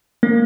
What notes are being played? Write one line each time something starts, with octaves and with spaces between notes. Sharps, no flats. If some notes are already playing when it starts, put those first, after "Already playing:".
A#3